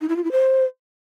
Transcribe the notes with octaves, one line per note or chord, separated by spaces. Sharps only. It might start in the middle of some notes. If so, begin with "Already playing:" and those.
D#4
E4
F4
E4
C5